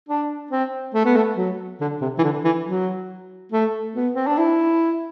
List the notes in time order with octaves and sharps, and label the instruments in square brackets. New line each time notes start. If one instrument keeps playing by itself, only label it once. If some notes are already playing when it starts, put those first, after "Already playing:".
[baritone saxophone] D4
C4
A3
B3
A3
F#3
D3
C3
E3
D3
E3
F#3
A3
B3
C4
D4
E4